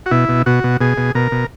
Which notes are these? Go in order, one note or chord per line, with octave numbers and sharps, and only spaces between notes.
F#4
B2 E4
B2
B2 F#4
B2
B2 G#4
B2
B2 A#4
B2